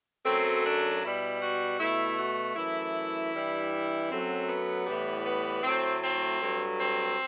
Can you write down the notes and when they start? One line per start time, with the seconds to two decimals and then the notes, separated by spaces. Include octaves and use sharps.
0.25 F#2 F#3 A3 C4
0.64 D4
1.02 B2 G3 E4
1.40 F#4
1.79 B2 A3 E4
2.17 F#4
2.55 F#2 E3 A3 E4
3.32 G2 E3 G3
4.09 F#2 F#3 A3 C4
4.48 B3
4.86 A2 E3 G3
5.24 B3
5.63 A2 F#3 A3 C4
6.02 C4
6.40 G2 F#3 A3
6.78 C4